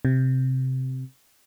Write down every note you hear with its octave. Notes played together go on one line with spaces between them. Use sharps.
C3